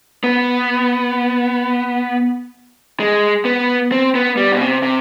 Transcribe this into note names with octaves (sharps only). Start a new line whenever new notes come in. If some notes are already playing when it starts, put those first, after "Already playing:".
B3
G#3
B3
C4
B3
G3
B2
C3
C3